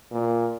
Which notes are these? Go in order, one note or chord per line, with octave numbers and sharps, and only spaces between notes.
A#2